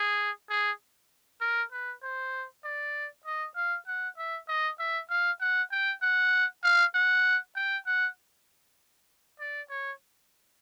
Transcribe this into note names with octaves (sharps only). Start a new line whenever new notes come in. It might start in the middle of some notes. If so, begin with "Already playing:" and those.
Already playing: G#4
G#4
A#4
B4
C5
D5
D#5
F5
F#5
E5
D#5
E5
F5
F#5
G5
F#5
F5
F#5
G5
F#5
D5
C#5